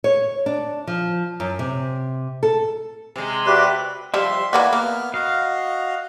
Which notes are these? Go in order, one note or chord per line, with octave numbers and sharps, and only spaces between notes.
C#5
D4
F3
F#2
C3
A4
C3 G#3
F#4 G4 B4 D5 E5
F3 G3 E5 C6
E3 A#3 F#4 B4 D5 G#5
A#3 B3 F6 F#6
F#4 D#5 F5